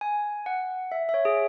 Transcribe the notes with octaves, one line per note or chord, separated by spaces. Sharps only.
G#5
F#5
E5
E5
C#5
G#4